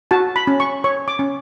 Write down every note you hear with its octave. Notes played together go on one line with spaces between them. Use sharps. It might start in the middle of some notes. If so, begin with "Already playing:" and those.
F#4 A5
B5
C#4
C#6
C#5 C#6
D6
C#4